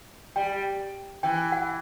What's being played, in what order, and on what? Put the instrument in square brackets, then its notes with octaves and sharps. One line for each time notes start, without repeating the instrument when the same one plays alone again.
[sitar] G3 [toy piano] G5
[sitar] E3 [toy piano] G5
[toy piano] F#5